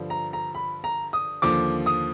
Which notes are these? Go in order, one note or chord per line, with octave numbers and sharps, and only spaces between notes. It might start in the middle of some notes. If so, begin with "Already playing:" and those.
Already playing: G2 D3 F3
A#5
A#5
B5
A#5
D#6
D#2 D3 F3 D6
D#6